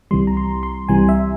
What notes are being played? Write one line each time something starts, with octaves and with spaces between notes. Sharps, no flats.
C2 C3 E3 G3 C6
A#5
C6
C6
C2 C3 E3 G3 G#5
E5